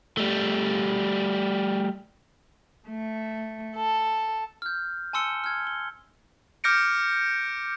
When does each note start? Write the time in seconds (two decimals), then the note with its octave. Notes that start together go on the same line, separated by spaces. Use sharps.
0.17 G3 A3
2.88 A3
3.76 A4
4.62 F6 G6
5.13 G#5 A5 C6 E6 C#7 G7
5.44 F6 G#6
5.67 G7
6.64 D6 F6 G6 A#6 C#7 D7